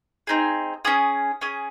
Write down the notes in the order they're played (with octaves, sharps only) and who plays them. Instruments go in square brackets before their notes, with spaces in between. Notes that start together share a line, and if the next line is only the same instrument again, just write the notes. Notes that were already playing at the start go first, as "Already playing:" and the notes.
[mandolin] C4 D#4 G#4
C#4 G#4 D#6
C#4 G#4